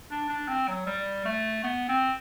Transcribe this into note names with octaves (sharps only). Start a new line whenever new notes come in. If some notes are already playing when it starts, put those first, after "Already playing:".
D4
D4
C4
F#3
G3
A3
B3
C4